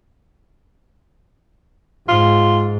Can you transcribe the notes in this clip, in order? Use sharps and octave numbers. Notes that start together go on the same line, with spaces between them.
G#2 F4